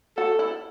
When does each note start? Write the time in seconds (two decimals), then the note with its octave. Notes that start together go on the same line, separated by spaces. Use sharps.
0.17 F#4 A4
0.39 E4